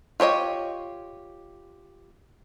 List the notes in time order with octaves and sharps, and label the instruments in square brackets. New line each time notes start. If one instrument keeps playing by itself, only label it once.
[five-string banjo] F4 G4 C#5 D#5